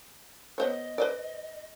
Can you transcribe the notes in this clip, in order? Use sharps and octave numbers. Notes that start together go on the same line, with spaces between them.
B3 C5 C#5 D#5
B4 C5 D5